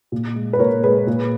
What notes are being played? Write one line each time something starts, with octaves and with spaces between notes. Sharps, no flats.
A#2
G#3
B4
A#2 A#4 C#5
G#3 G#4 B4
A#2